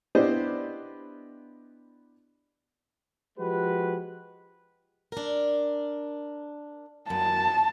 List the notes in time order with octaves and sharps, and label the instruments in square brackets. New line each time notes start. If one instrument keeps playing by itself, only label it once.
[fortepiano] B3 D4 E4 G4 C5 D#5
[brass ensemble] F3 G#3 F#4 G4 B4
[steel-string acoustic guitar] D4 A#4
[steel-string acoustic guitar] F#2 [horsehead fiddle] A5